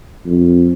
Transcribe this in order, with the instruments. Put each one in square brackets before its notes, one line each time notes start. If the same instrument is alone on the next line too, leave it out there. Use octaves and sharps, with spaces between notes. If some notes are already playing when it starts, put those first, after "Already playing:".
[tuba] F2